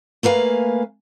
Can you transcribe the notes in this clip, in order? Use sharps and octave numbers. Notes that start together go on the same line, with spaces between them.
A3 A#3 B4 F5 G#5